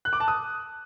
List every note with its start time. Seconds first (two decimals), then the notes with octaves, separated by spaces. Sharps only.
0.05 F#6
0.13 D6
0.20 A5
0.28 D#6